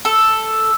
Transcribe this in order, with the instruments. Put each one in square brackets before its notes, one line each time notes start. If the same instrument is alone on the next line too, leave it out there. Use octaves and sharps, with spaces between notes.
[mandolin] A4